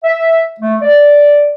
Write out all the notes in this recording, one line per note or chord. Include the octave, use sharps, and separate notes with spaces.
E5
A3
D5